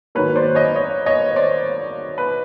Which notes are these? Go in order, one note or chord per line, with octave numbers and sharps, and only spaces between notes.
G#2 D#3 F#3 A#3 B4 C#5
C5 D5
C#5 D#5
C#5 D#5
C#5 D#5
C5 D5
B4